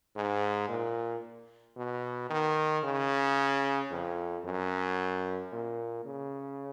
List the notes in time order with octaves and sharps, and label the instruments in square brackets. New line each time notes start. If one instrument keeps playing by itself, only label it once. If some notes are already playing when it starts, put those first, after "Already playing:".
[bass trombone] G#2
A#2
B2
D#3
C#3
F2
F#2
A#2
C#3